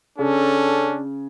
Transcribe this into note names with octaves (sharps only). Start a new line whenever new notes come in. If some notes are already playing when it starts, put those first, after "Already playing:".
C#3 C#4 D4 A4